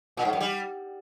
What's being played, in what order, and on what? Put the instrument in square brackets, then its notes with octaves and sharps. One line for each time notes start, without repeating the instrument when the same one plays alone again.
[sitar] A#2
G#2
F#2
G3